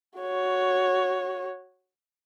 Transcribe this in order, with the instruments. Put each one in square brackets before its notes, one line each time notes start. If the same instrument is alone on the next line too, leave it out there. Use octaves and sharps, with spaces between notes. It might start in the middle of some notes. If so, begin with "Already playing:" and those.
[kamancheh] F#4 C#5